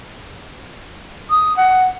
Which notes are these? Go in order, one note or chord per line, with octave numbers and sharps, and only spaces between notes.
D#6
F#5